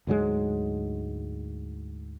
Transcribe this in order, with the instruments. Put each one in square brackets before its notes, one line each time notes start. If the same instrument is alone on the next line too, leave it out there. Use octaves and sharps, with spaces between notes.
[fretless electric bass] D2 G#2 F#3 G#3